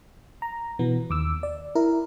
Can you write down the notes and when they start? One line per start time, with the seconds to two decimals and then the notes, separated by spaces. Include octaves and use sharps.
0.42 A#5
0.79 B2 E3 B3
1.10 D#2 D6 E6
1.43 D5
1.75 E4 A#4